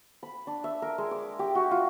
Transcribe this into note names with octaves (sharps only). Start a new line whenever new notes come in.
B5
D4
E5
A#4
G#3
D6
G4
F#4
F4